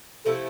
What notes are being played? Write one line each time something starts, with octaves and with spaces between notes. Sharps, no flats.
C3 F3 A3 E4 A4